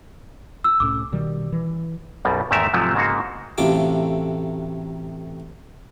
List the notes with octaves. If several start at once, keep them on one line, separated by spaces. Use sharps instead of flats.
E6
C2 A2 C#4 D6
B2 D#3 G3
E3
B1 F#2 B2 G3
E2 G#2 D#3 A3 A#4 E5
G#2 C3 F3 F#3 A3
G#2 C#3 A#3 F#4
A1 C3 F#3 A3 F4 D6